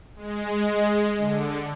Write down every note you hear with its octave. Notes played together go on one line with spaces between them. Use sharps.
G#3
D3